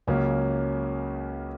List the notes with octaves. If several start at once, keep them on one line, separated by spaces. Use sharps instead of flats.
C#2 C#3 F#3 A#3 C#4